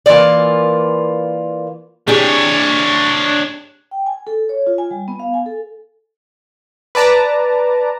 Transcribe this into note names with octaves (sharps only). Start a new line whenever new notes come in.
E3 A#3 F4 D5
D4 G4 G#4 C#5
G5
G#5
A4
C#5
F4
G#5
G3
B3
F5
G#5
A4
B4 D5 A5 A#5